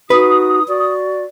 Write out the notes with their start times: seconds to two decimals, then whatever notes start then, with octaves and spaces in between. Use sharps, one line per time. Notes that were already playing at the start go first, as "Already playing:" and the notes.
0.10 D#4 F#4 B4 D#6
0.68 F#4 D5